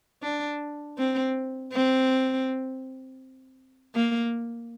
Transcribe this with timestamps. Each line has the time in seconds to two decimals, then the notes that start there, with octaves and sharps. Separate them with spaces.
0.22 D4
0.98 C4
1.72 C4
3.95 A#3